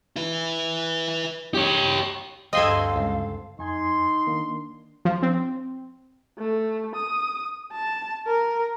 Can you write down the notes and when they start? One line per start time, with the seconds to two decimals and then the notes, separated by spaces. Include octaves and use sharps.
0.16 E4 B4
1.54 G4 C#5
2.53 D2 G2 C4 A4 D#5 F5 C6 G#6
2.96 C#2
3.59 F2 D#4 G#5 C6 G#6
4.27 D#3 A#3 D4
5.05 F3
5.22 C4
6.38 A3
6.95 D#6
7.72 A5
8.27 A#4